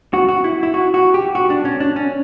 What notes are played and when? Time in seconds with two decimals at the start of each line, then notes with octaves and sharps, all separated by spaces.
0.14 F#4
0.29 F#4
0.44 E4
0.63 E4
0.74 F#4
0.94 F#4
1.14 G4
1.35 F#4
1.50 D4
1.65 C#4
1.80 D4
1.96 C#4